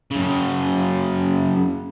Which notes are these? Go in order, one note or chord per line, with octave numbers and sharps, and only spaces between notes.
F#2 C#3